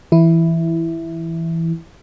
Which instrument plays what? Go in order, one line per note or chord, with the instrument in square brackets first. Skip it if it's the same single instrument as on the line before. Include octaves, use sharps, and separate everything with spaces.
[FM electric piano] E3 E4